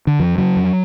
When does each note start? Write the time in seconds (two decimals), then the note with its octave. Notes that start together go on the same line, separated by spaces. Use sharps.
0.07 D3
0.20 F2 F3
0.38 C#3 F#3
0.56 F2